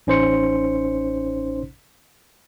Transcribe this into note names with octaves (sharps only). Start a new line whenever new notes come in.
A1 C#4 D#4 C5 C6 C#7